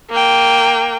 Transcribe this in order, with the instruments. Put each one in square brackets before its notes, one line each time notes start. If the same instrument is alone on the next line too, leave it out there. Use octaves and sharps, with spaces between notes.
[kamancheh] A#3 G5